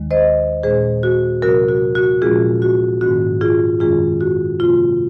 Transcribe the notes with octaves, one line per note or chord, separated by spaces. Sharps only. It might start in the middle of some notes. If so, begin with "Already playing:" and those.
Already playing: D#2 D#3 G#3
C5 D#5
A#2 G#3 C#4 G#4 C5
F#4
C3 F#3 C4 F#4 A#4
F#4
F#4
A#2 F3 G#3 C#4 F4 G#4
F#4
G#2 D#3 A#3 C#4 F#4
F4 G#4
F#2 D#3 G#3 C#4 F4 G#4
F#4
C3 F3 A#3 F4